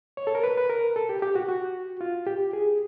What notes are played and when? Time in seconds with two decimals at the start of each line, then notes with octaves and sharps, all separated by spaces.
0.17 C#5
0.27 A4
0.35 A#4
0.44 B4
0.58 B4
0.69 A#4
0.96 A4
1.09 G4
1.22 G4
1.36 F#4
1.49 F#4
2.01 F4
2.27 G4
2.53 G#4